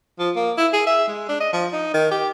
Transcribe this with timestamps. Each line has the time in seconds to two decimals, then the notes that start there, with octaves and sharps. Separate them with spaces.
0.19 F3
0.36 A#3
0.58 E4
0.73 G#4
0.87 E5
1.08 G#3
1.29 D4
1.40 D#5
1.53 F3
1.73 D#4
1.94 D#3
2.11 G4